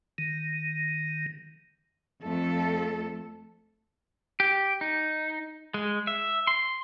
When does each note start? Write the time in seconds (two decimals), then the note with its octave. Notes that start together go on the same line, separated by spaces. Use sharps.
0.18 D#3
2.23 F2 A3 A4
4.40 G4
4.81 D#4
5.74 G#3
6.07 E5
6.47 C6